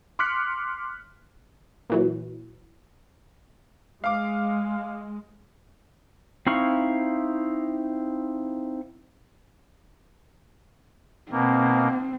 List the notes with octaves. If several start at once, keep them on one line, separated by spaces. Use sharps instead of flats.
C6 D6 F6 F#6 B6 C#7
A#2 E3 F#3
G#3 F5 D6
C4 D#4 E4 F5 C#6
B2 A#3 C4